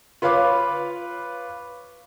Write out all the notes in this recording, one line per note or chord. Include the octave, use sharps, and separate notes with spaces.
F4 B4 C#5 F5 B5 D6